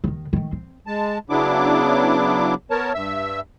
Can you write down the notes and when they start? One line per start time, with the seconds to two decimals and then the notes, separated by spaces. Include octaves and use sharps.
0.04 D#2 D#3
0.33 D#3 A3
0.52 C4
0.87 G#3 A5
1.30 C#3 F#3 B3 D4 E4 D6
2.71 B3 A#4 C#5 A5
2.94 G2 E5 E6